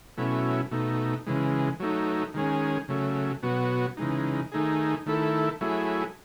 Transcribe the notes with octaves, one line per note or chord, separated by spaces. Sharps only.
B2 F#3 A3 C#4 E4
B2 A3 D#4
C#3 E3 G#3
F#3 A3 D#4
D#3 G#3 C#4 G#4
C#3 F#3 A3
B2 F#3 B3 F#4
C#3 E3 G#3 D#4
D#3 A3 D#4 G#4
D#3 A3 E4 A4
F#3 A3 E4 G#4